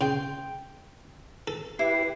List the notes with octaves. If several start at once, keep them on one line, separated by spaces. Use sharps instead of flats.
C#3 G5 C6
A4
E4 G4 B4 C7